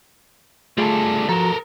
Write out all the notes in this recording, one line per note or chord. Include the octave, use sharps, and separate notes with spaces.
G3 A3 F4 G#4 A4
F3 F#4 A4 A#4 A#5